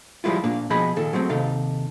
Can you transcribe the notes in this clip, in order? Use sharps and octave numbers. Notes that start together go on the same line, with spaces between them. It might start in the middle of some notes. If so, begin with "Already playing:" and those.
F3 G3 G#3 E4 F4
A#2 A#3 D4 F5
B2 F3 G#4 D#5 B5
A#2 D#3 A4
F#3 G#3 A3 C4
D#2 C3 D#4 A4 F5